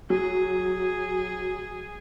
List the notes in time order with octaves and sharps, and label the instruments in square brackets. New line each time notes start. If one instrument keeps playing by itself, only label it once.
[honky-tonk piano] F#3 [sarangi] G#4